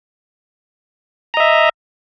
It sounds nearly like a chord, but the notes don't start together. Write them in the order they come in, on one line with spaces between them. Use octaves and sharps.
A#5 D#5 E5